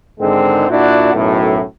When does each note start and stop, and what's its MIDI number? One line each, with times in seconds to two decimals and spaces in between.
0.20 0.66 44
0.20 0.66 50
0.20 0.66 51
0.20 0.66 56
0.20 0.66 60
0.70 1.12 46
0.70 1.12 62
0.70 1.12 64
0.70 1.12 66
1.14 1.61 35
1.14 1.61 42
1.14 1.61 45